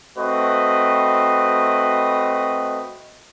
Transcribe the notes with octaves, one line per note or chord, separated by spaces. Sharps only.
A3 C4 F#4 B4 D#5